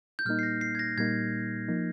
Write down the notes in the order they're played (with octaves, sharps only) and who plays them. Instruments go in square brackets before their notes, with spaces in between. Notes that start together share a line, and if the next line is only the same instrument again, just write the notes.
[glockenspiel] G6
[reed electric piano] A#2 G3 A#3 D#4 [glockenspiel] F6
[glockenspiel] C7
A#6
C7
G#6
A#6
[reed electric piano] A#2 G3 A#3 D#4 [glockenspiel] G#6
[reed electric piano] F3 A#3 D#4